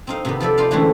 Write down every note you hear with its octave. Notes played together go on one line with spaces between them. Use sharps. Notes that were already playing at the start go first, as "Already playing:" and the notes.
C4 D#4 F5
C3 D#3 B3
F3 A4 D5 E5
D#4 F4 C5 D5 F5
D3 E3 G#3 A3 C4 C#4